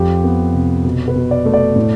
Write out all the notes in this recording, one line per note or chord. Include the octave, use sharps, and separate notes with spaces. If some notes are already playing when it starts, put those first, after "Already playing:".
Already playing: F2 G4
B3
C3
B2
B4
B2
D5
A3
D5
A2